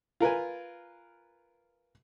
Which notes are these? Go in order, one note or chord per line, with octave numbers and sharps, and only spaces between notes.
F4 A#4 B4 G#5